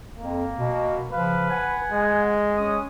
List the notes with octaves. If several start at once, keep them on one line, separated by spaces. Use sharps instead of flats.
F2 A#3
B2
C#3 F3 B4 F5
F#5 G#5
G#3
C#4 D#6